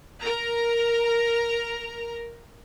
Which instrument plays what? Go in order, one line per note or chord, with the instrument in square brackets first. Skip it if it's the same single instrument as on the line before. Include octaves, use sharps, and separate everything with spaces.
[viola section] A#4 A#5